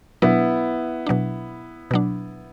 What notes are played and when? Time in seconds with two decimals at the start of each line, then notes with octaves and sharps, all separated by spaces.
0.22 B2 F#3 B3 D4 E4
1.07 B2 F#3 D4
1.91 B2 F#3 D4